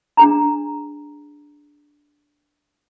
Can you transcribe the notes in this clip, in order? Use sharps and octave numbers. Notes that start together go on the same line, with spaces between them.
D4 G#4 A#5